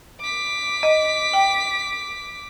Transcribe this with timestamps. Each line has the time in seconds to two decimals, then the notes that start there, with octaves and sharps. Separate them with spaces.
0.21 D6 B6
0.83 D#5
1.33 G5